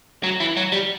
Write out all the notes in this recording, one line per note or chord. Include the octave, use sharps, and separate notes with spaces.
F#3
E3
F#3
G3